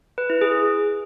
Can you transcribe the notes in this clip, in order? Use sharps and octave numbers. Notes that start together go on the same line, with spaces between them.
B4
E4
G#4